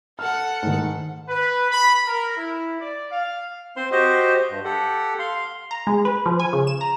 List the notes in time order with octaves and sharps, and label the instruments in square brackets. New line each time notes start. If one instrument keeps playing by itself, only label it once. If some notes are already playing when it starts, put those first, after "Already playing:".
[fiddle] A4 F#5 [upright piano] F6
[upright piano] G#2 D#3
[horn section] B4
B5
A#4
E4
D5
F5
[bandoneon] C4 C5 C6
F#4 G4 C5 D#5
G2
G4 A4 F#5
F5 C6
[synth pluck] A#5
G#3
B4
F3
G#5
C#3
E7
A#5